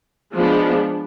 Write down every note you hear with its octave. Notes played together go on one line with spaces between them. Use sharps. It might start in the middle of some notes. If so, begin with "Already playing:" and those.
F3 G#3 B3 D4